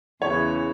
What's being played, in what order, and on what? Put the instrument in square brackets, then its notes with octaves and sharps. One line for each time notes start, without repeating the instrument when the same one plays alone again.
[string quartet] E2 C#3 E3 [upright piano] C#5